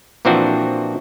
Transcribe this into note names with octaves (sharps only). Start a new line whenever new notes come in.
A#2 E3 F3 C4 D4 F#4